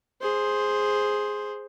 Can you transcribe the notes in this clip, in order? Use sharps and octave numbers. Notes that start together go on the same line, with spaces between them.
G#4 C5